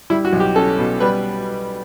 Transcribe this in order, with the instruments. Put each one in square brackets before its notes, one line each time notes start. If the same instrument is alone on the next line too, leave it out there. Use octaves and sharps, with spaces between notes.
[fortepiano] G3 E4
F#4
B1
G4
C#4 A4
B2
G3 B4